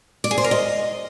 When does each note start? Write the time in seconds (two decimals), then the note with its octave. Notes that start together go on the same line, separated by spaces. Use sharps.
0.24 D5
0.31 G#4
0.38 C5
0.44 A#4
0.51 D#5